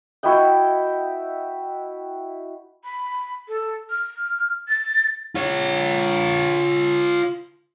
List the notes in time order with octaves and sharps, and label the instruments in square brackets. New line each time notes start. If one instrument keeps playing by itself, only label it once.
[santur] E4 F#4 D#5 G5
[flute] B5
A4
F6
A6
[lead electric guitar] F4 C#5